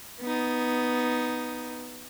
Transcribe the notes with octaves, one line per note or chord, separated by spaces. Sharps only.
B3 D#4